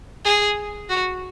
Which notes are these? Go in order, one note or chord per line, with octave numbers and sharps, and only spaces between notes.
G#4
F#4